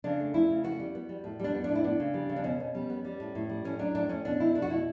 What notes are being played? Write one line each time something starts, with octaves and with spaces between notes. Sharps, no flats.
C#3 D4
A3
A3 E4
C#3
B3 F#4
G3
B3
G3
A2
G3 D4
B3
A2 D4
E4
B3 D4
C#3
G3
C#3
D4
B2 C#4
B2
G3
B3
G3
A2
A2
G3
A2 C#4
F#3 D4
A2 D4
A2 C#4
B2 D4
B2 E4
A3 D4
F#4
B2 E4